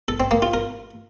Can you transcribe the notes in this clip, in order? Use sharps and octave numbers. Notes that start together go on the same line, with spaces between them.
A4
C4
A#3
F4
A#4